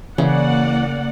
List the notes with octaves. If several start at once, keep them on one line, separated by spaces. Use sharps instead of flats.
C#3 E3 A#3 D5 F#5